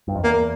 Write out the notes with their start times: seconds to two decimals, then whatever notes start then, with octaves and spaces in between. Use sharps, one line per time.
0.08 G2
0.15 F2
0.23 E2 A#3